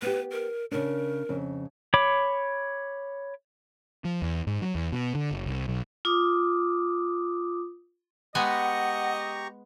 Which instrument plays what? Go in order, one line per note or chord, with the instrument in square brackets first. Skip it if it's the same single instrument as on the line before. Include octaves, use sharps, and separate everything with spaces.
[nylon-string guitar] B3 G4 [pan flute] B4
[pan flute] A#4
[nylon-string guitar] C#3 D4 [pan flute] A#4
[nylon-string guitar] F2 C#3
[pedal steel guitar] C#5 B5 D6
[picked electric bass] F3
E2
G#2
F#3
E2
B2
D3
F#1
C2
B1
[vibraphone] F4 D6 D#6
[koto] G#3 B3 G#5 [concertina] G4 A#5 C#6 [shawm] D#5 [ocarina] F#5